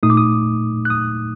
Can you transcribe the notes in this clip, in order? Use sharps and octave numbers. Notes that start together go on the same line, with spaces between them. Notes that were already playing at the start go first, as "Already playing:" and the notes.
A#2 A3 D#4 D#6
D6
D#6
F#6
D#6